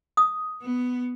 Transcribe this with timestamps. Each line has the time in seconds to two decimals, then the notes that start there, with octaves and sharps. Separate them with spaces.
0.17 D#6
0.64 B3